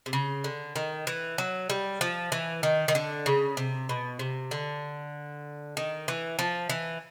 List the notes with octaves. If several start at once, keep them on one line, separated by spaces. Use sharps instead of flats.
C3
C#3
D3
D#3
E3
F#3
G3
F3
E3
D#3
D#3
D3
C#3
C3
B2
C3
D3
D#3
E3
F3
E3